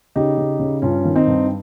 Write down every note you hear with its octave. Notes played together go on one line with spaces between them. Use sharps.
C#3 D#4 G4
C#3
C#3
G2 C#4 F4
D#3
C4 D#4
G2